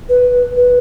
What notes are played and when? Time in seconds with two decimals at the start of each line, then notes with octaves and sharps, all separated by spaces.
0.09 B4
0.57 B4